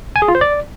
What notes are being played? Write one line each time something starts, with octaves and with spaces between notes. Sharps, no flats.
G#5
G#4
F4
C5
D5